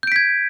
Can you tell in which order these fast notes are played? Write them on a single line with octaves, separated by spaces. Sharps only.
G6 D7 B6 G#6